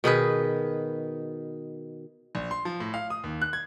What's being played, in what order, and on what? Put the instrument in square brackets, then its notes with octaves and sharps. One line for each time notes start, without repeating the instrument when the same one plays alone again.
[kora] B2 D#3 G#4 B4
[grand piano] A#1
C6
F3
A2
F5
D#6
D#2
F#6
G#6